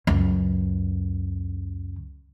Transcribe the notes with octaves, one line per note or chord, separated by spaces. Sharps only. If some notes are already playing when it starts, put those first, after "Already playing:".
C#2 F#2